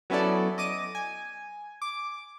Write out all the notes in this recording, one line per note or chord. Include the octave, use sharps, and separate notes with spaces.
F#3 B3 C#4 E4 A4 D5
D#5 D6 D#7
G#5
D6